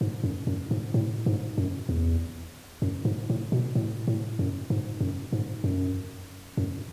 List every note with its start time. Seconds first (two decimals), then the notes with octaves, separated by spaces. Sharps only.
0.01 G#2
0.23 F#2
0.47 F#2
0.71 G#2
0.94 A2
1.26 G#2
1.58 F#2
1.89 E2
2.82 F#2
3.05 G#2
3.30 A2
3.52 B2
3.75 A2
4.07 A2
4.39 F#2
4.70 G#2
5.00 F#2
5.33 G#2
5.64 F#2
6.57 F#2